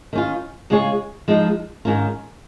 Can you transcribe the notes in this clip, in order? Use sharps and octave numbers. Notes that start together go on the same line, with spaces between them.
D#3 C#4 F4
C#3 G#3 F4 G#4 C#5
F3 G#3 D#4
G#2 D#3 C#4 F4 A#4